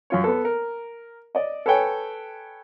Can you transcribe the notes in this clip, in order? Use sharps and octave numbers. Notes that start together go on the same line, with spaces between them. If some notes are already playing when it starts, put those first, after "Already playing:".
F#2 F4 C#5
B3 A4
A#4
D5 D#5
A4 B4 C#5 G5 G#5